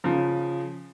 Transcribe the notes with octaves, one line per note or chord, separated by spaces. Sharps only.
C#3 F3